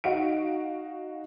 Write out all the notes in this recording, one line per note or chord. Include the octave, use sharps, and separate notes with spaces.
D#4 F#4 F5 D7